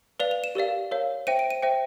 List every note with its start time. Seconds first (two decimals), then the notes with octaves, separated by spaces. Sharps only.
0.20 B4 D5 F5 F7
0.31 F7
0.44 E7
0.55 G4 A#4 D5 F5
0.91 A#4 C#5 F5
1.27 C5 E5 G5 D#7
1.39 D7
1.50 D#7
1.62 C5 E5 G5